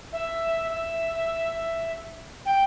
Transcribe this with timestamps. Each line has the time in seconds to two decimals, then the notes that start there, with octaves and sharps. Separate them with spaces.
0.13 E5
0.69 E5
2.46 G5